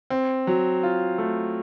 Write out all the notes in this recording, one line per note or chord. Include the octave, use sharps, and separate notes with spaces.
C4
F#3
F4
A3